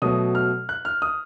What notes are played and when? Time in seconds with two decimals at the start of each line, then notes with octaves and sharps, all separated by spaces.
0.02 B2 F#3 A3 D#6
0.35 F6
0.69 F#6
0.85 F6
1.02 D#6